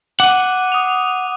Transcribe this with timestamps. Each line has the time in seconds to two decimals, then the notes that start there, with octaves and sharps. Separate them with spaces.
0.20 F#5 D6 F#6 D#7
0.72 D#6 F7